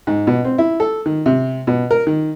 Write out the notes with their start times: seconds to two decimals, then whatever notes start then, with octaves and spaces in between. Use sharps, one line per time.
0.07 G#2
0.27 B2
0.45 C4
0.58 E4
0.80 A4
1.06 D#3
1.26 C3
1.67 B2
1.91 A#4
2.07 D#3